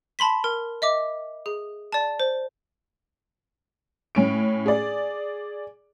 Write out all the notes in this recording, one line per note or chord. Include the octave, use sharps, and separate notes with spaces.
A5 B5 C6 B6
A#4
D#5 E5 D6
G#4
D5 A5
C5
A2 C#4 D7
G#4 D5